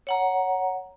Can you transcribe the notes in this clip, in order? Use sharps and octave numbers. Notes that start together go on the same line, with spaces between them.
C#5 F#5 A#5